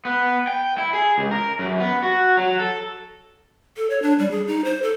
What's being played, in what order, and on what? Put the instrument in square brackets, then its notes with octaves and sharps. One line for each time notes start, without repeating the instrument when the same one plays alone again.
[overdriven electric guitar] B3
G5
E4
G#4
C#2
A#4
F#2
B3
F#4
F#3
A4
[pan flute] A4
C#5
D4
G3
G#4
D#4
C5
A4